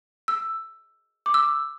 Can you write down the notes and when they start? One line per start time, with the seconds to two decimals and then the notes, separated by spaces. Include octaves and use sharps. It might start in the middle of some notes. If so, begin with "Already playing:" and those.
0.28 E6
1.26 D6
1.34 E6